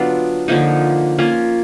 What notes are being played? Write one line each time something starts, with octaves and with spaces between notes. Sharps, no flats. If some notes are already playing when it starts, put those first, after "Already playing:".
Already playing: D3 F#3 B3 D4 F4
D3 F3 A#3 D#4
A#3 C#4 F4